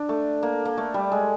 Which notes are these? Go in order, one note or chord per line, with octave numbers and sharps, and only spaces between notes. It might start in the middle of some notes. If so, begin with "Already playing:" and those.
Already playing: D4
A3
A#3
A#3
A3
G3
G#3